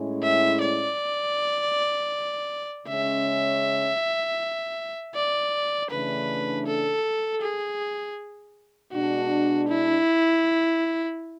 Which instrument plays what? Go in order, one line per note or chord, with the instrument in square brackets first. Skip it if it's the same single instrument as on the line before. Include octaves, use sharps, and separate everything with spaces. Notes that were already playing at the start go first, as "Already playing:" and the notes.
Already playing: [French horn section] A2 G#3 C#4 E4
[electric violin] E5
D5
[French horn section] C#3 G#3 C#4 [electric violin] E5
[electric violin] D5
[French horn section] C#3 E3 A3 D4 [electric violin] B4
[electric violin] A4
G#4
[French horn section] B2 G#3 D4 [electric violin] F#4
[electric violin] E4